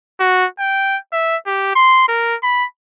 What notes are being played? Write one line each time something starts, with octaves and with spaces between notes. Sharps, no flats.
F#4
G5
E5
G4
C6
A#4
B5